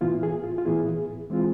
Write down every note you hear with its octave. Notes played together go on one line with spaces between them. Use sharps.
A2 E3 B3 E4 F4
G#4
F4
F4
A2 E3 B3 E4 G#4
E3 G#3 C4 F4